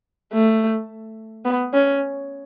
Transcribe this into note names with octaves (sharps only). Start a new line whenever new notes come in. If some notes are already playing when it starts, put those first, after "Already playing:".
A3
B3
C#4